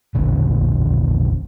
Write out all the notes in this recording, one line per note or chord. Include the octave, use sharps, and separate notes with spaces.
E1 A#1 D3